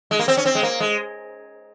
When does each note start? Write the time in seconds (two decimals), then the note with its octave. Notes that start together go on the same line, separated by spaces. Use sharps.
0.11 G#3
0.19 A#3
0.28 C4
0.37 C#4
0.46 C4
0.55 G#3
0.63 A#3
0.80 G#3